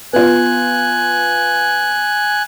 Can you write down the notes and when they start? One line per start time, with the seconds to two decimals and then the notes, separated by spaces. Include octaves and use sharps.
0.13 B3 F4 G#5 F#6